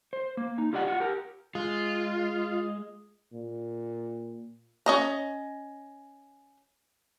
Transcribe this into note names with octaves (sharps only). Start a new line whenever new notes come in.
C5
A#3
D#4
F4 G4 D5 D#5 F#5
F4 F#5
G4 A#4
G#3 F4
A#2
C#4 D#5 A#5